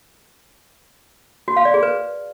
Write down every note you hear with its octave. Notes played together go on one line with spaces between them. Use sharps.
F#4
F5
D5
G#4
B4